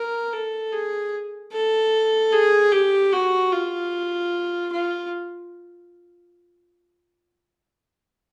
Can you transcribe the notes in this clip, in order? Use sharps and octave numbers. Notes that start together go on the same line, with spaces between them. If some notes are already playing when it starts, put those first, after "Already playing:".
Already playing: A#4
A4
G#4
A4
G#4
G4
F#4
F4
F4